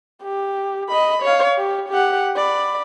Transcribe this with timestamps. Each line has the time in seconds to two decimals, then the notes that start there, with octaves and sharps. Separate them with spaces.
0.23 G4
0.89 D#5 B5
1.23 C#5 F5
1.58 G4
1.89 G4 F#5
2.36 D5 B5